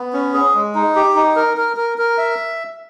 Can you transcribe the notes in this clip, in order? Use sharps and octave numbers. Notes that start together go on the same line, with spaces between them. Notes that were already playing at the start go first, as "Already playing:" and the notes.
Already playing: B3
C#4
G#4
G#3
D#4
G4
D#4
A#4
A#4
A#4
A#4
E5